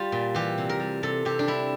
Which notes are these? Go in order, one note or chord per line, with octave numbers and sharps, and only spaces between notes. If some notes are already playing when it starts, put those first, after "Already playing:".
Already playing: G3 F4
A#2
E3 G4
C3
A#4
G3
C3 A4
C3 G4
D4
G3 E4